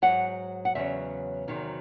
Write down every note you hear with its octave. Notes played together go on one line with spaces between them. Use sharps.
G#2 F#3 F#5
F#5
E2 C#3 F#3 E5
E2 C3 D#3 F#3